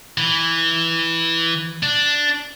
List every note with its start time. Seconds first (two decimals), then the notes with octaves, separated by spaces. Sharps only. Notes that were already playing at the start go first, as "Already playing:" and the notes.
0.18 E3
1.83 D4